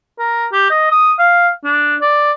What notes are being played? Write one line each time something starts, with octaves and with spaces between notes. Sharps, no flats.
A#4
G4
D#5
D#6
F5
D4
D5